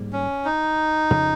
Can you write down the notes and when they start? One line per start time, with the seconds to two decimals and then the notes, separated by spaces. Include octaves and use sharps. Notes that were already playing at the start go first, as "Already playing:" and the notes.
Already playing: G#1 G#2 G3 A#3
0.13 C#4
0.45 D#4
1.10 F2 C#3